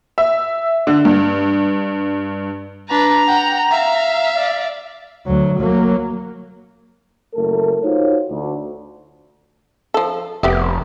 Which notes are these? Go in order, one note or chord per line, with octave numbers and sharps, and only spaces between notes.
E5
D3
G2
D4 B4 A#5
F#5 G5
E5 F5
D5
D2 F#3
F#3 A#3
F#1 A3 A4 A#4
D#4 F4 F#4 C5 C#5
D2
F3 A4
F1 B3 G4 E5